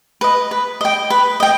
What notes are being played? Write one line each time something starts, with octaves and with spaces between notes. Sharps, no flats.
B4 D#5
B4
D#5 G5
B4
D#5 G5